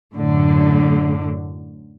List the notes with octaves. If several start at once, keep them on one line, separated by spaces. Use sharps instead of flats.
F#2 A2 D3